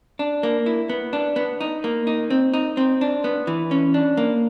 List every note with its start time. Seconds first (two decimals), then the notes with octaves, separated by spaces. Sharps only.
0.19 D4
0.43 A#3
0.66 E4
0.89 B3
1.13 D4
1.36 B3
1.61 D#4
1.84 A#3
2.07 D#4
2.30 C4
2.54 D#4
2.77 C4
3.01 D4
3.24 B3
3.47 E3
3.71 C#4
3.94 D4
4.17 A#3